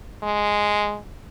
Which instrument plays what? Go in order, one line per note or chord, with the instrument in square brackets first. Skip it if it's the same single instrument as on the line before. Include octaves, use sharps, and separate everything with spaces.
[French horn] G#3